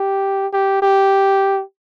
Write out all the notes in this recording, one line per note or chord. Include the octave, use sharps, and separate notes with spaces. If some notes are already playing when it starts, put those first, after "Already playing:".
Already playing: G4
G4
G4